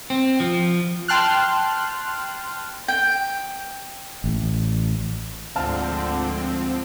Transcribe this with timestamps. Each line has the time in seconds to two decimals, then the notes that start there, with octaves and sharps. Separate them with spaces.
0.10 C4
0.40 F3
1.08 G5 A5 C6 F6 F#6
2.88 G5
4.24 A1
5.55 D2 G#2 D3 F3 C4 F5 A5 F6